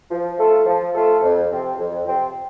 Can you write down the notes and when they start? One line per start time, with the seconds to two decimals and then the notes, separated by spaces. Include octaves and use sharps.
0.11 F3
0.39 A3 F4 A4
0.66 F3
0.94 A3 F4 A4
1.22 F2
1.50 C3 F3 C4
1.78 F2
2.05 C3 F3 C4